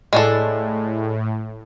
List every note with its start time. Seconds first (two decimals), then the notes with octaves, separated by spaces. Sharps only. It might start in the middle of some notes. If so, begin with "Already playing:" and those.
0.13 A2 G#3 D4 A4